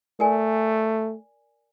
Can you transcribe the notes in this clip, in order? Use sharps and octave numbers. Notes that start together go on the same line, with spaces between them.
A3 A#4 D5 G#5